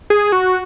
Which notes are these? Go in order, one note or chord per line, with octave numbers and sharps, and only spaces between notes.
G#4
F#4